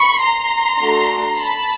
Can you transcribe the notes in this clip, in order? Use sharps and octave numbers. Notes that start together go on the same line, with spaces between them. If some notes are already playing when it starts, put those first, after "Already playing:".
Already playing: B5 C#6
A#5 C6
A3 D4 F#4 A4
A5 B5